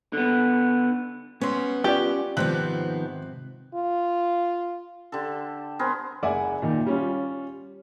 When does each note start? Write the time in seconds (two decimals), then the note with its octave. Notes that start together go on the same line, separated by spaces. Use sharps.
0.13 D3 B3
1.41 G3 B3 C#4 C#5 C6
1.84 C#4 F4 G4 D5
2.37 G#2 C3 D#3 F3 B3 C4 F#6
3.75 F4
5.12 D3 G4 A4
5.79 B3 C4 G#4 A#4
6.23 F#1 D5 E5 F#5 G#5
6.62 A#2 D#3
6.87 G3 C#4 F4